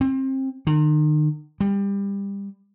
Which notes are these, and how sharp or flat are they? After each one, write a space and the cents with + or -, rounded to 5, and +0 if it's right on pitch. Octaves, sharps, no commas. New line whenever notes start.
C4 +30
D#3 -40
G3 +25